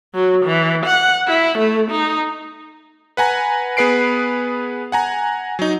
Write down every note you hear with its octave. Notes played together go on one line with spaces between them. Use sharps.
F#3
E3
F#5
E4
A3
D#4
B4 F#5 G#5 A#5
B3 G#4 B4 C7 D7
F#5 G#5 A#5
F#3 D#4